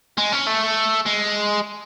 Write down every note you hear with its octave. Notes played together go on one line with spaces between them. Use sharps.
G#3
C#4
A3
G#3